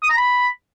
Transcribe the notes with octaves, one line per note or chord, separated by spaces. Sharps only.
D#6
A#5
B5